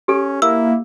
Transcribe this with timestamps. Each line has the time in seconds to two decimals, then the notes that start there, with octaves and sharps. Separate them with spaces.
0.08 C#4 G4 A4
0.42 A#3 E4 E6